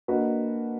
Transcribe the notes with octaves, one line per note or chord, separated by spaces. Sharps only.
A#3 D4 F#4 B4 D#5